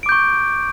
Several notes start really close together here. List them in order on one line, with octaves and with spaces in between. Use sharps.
D7 D6 G6 C#6